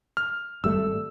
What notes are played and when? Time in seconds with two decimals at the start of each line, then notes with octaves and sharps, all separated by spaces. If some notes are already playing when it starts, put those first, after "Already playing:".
0.17 F6
0.64 G#1 G3 A3 E6